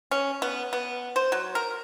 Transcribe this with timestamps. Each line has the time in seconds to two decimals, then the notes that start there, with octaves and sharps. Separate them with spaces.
0.11 C#4
0.42 B3
0.73 B3
1.16 C5
1.32 F#3
1.55 A#4